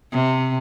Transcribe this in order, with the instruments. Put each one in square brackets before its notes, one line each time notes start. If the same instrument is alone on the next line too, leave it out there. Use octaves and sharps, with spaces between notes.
[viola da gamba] C3